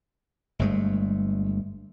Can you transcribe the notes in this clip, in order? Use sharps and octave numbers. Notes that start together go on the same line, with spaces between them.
G1 G2 G#3 A3